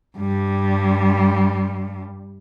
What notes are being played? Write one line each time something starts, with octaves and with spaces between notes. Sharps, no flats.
G2 G3